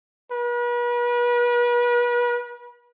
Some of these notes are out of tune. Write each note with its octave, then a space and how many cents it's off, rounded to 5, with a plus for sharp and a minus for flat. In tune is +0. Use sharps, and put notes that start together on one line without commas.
B4 -40